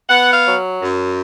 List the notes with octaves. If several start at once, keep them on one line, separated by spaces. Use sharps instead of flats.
B3 F#5
F5
F#3
F#2